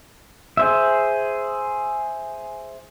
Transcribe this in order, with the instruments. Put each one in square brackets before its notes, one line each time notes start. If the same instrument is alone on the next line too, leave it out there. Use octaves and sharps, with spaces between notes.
[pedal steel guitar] G#4 C5 E5